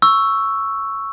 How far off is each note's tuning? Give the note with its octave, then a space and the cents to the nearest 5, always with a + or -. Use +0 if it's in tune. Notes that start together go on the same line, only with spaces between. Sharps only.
C#6 +0 E6 +0